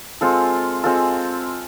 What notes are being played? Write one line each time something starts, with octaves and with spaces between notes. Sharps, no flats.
G#3 C4 F4 A4
G#3 C4 F4 A4